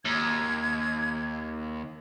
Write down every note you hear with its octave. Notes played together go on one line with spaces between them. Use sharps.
D#2 G#6